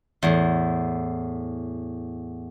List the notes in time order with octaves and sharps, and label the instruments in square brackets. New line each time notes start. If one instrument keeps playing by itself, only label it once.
[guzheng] E2 A2